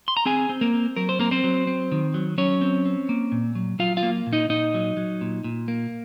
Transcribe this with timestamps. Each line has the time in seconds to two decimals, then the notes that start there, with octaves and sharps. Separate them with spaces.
0.08 C6
0.17 A#5
0.26 C4 G#4 G#5
0.49 C4
0.61 A#3 A#4
0.74 C4
0.96 F#3 A#4
1.09 C5
1.19 A#3 C4 A#4
1.31 C4 C5
1.44 F#3
1.67 C4
1.92 D#3
2.14 F#3
2.38 F#3 C#4 C#5
2.61 C4
2.85 C4
3.09 A#3
3.32 A#2
3.55 F#3
3.79 F#3 F4 F5
3.97 F4 F5
4.03 A#3
4.27 A#2
4.33 D#4 D#5
4.49 A#2 D#4 D#5
4.74 F#3
4.97 F#3
5.21 A#2
5.44 A#2
5.68 A#3